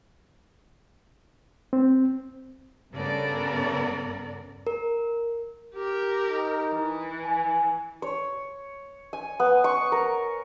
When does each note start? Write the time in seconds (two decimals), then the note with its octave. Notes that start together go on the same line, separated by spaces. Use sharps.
1.73 C4
2.94 G2 C#3 B3 A4 A#4 D5
4.67 A#4
5.75 G4 A#4
6.28 D#4
6.73 E3
7.25 G#5
8.02 C#5
9.13 G#5
9.40 B3
9.64 C#6
9.92 A#4